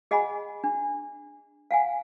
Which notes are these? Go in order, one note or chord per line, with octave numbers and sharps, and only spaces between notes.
G#4 D#5 F#5 G#5 B5
D4
F5 F#5 G#5